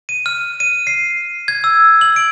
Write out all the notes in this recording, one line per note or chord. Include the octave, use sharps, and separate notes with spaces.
D#7
F6
D#7
C7
G#6
E6
F#7
D7